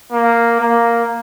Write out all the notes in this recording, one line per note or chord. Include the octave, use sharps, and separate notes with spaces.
A#3
A#3